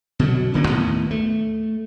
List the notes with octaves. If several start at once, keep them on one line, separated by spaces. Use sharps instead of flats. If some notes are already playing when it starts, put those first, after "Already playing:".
B2 D3 F#3
D#1 D3 A#3 C#4
D#2 A2 D#3 B3
A3